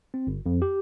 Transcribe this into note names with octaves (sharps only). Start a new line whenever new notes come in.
C4
G1
F2
G4